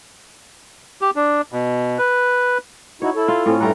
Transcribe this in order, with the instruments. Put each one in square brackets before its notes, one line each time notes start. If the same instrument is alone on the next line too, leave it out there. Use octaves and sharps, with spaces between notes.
[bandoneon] G4
D4
B2
B4
[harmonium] D#4 E4 F#4 [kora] C#5
[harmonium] E4 A4
[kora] F4
[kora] A2 A3 C#4 [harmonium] C4
[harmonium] G2 A3 A#5 [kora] G3 E4 F#5